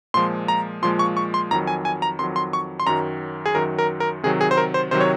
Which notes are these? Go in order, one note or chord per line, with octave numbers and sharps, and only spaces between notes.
A#2 F3 G#3 C6
A#5
A#2 F3 G#3 C6
C#6
C#6
C6
F2 D#3 F#3 A#5
G#5
G#5
A#5
F2 D#3 F#3 C6
C6
C#6
C6
F#2 D#3 F#3 A#5
G#4
F#2 D#3 F#3 A#4
A#4
A#4
C3 D#3 F#3 G#4
G#4
C5
A#4
C5
C3 D#3 F#3 C5
C#5